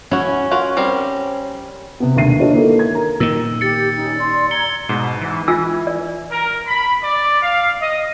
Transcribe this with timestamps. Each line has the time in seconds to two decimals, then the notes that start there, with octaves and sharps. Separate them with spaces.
0.11 C#4 E4 F#4
0.51 F4 F#4 A#4
0.77 G3 C4 A#4
2.00 C3 B3
2.16 E1 D#2 D3 E5 C7 D#7
2.40 D4 F4 F#4 B4 C#5 D#5
2.52 D#3 A#3 E4 A4 A#4
2.79 G#6
2.94 A#4 A#5
3.20 A#2 D#3 E6
3.61 G4 A6 C#7
3.96 C#4 D#4
4.18 D5 C6
4.51 A#5 G#6 C#7 G7
4.89 G#2 B2
5.21 E3
5.48 E3 F4 G#5 E6
5.87 D5
6.30 A#4
6.67 B5
7.02 D5
7.42 F5
7.80 D#5